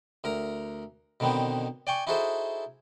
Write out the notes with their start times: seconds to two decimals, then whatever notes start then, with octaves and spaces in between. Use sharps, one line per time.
0.24 D2 A#4 A#5
1.20 B2 D3 D#3 B3 C4
1.87 D5 G5 G#5 C#6
2.07 D#4 E4 F#4 G#4 A4 C5